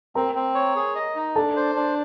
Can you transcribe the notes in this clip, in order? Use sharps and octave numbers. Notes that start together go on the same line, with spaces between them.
C4 A#4 A#5
C4
C#5
G#4
D#5
D#4
D4 A4 A5
C5
D4